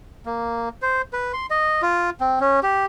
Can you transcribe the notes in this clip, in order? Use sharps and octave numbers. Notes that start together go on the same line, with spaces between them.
A#3
C5
B4
C6
D#5
F4
C4
C#4
G4